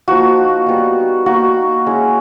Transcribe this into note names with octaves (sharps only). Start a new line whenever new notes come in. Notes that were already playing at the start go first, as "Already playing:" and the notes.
F3 A#3 D#4 F#4
G3 B3 D#4
A#3 D#4 F#4
G#3 C#4 E4